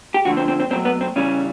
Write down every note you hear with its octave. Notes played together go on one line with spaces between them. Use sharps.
G4
D3 F3 A3 F#4
C4
C4
C4
B2 F#3 A3 C4
B3
C4
C#3 E3 G3 C#4